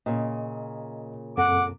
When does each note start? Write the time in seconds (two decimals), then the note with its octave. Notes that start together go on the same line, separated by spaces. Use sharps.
0.06 A#2 C#3 D#5
1.37 F#2 C4 A4 F#5 D6